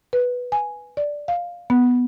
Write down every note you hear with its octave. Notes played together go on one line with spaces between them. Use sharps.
B4
G#5
D5
F5
B3